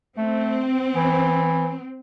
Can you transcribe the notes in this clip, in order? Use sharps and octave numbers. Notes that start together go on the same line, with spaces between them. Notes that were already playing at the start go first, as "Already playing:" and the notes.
A3 C4
E3